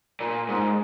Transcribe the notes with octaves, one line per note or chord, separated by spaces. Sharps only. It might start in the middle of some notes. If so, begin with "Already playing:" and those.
A#2
G#2